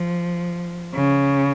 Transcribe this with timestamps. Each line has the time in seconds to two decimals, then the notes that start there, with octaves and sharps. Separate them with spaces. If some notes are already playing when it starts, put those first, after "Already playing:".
Already playing: F3
0.95 C#3